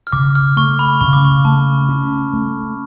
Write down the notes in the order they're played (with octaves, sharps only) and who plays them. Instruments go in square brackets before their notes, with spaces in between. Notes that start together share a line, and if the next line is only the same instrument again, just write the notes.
[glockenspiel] F6
[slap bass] C#3 [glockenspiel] D6
[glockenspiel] F6
[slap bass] A3 [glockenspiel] C#6
[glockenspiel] B5
[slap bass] C#3 [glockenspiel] C#6
[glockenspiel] D6
C#6
[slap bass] A3 [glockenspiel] A5
[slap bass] C#4
A3